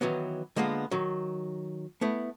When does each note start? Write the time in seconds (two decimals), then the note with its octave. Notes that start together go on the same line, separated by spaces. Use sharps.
0.01 D#3 E3 F#3 B3
0.56 D3 G#3 A#3 B3 F4
0.91 D#3 F#3
2.01 A3 B3 E4